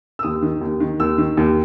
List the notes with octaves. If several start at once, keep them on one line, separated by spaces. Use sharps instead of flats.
E6
D#2 D#6
D#3
D#2
D#3
D#2 E6
D#3
D#2